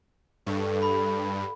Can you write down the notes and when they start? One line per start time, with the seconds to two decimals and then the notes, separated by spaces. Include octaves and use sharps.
0.47 G2 D3 A4 C#5
0.82 B5